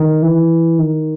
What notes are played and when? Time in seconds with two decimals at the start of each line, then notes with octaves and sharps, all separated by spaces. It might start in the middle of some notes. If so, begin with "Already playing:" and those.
Already playing: D#3
0.22 E3
0.79 D#3